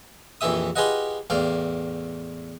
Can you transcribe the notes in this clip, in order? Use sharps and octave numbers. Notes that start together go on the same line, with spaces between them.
A#1 F2 E3 G4 E5 D#6
F4 G4 G#4 B4 D#5 F#5
E2 A2 D5 F5 G5